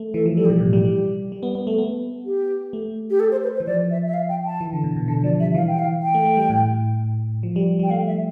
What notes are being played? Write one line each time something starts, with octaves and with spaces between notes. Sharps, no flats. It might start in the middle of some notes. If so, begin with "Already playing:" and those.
Already playing: A3
E3 A4
F3
G3 A4
G4
B2
A2 G4
G3
G3
G3
B3
B3
A3
B3
G4
A3
G4
A4
C5
B4
C5
E3
F3 D5
E5
E5
F5
G5
A5
E3
D3
B2
B2
D3 A5
F3 D5
G3 E5
E3 F5
G5
F5
G5
A3
A3
G3
A2
F3
G3
G3 G5
A3 F5
E5